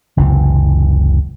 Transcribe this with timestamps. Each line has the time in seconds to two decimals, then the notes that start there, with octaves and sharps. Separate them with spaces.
0.17 F#1 C#2 C3 E3